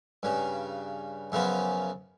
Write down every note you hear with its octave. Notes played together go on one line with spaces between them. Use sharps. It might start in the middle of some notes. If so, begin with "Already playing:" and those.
G2 C#3
F#2 C#3 F3 B3